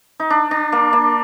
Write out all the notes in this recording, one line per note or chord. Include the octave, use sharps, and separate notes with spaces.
D#4
D4
D4
A#3
A#3